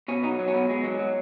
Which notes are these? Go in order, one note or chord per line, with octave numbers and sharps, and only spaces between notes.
B2 C#4
F#3 D#4
F#3
C#4
B2 B3
B2 G#3
F#3
F#3